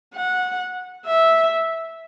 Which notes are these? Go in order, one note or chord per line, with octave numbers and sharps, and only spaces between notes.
F#5
E5